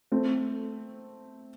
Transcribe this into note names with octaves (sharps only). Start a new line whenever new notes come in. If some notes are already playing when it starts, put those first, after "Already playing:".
A3 C4